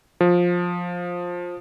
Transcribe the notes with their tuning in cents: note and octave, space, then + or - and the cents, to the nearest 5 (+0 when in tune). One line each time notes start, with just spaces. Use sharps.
F3 +15